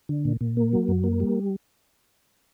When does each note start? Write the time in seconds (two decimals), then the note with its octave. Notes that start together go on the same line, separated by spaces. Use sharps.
0.09 D3
0.25 A#2
0.41 A#2
0.57 A#3
0.73 F#3
0.88 F#2
1.04 A#3
1.20 G3